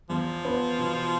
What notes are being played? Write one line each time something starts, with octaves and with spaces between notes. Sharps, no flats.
E2 F3
B3
B2